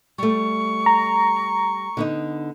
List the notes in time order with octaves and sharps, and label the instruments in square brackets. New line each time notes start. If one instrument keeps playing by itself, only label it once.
[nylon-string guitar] G3 A3 [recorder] C#6
[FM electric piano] A#5
[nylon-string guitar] D3 B3 D#4